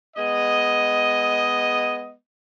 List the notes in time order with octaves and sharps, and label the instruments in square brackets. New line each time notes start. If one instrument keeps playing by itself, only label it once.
[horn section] G#3 B3 D#5